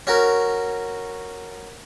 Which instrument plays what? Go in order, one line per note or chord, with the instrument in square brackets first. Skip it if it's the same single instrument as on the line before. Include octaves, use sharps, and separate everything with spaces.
[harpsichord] C#4 F#4 A#4